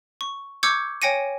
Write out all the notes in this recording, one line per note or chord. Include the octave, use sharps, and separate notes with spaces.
C#6
C#6 D6 E6 G6 G#6 C#7
C#5 G5 G#5 A#6 C#7 D#7